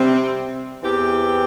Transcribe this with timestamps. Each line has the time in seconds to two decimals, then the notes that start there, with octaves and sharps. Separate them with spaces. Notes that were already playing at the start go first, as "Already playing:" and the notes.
Already playing: C3 G3 C4
0.83 E2 E3 C4 G4